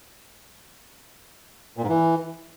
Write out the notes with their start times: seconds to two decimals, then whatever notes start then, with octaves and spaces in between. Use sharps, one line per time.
1.77 A#2
1.83 G#2
1.88 E3